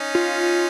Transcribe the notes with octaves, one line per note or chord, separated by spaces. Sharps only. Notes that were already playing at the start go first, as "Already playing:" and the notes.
Already playing: C#4 D#4
F4